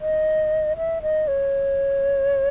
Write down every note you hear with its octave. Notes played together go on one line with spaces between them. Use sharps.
D#5
E5
D#5
C#5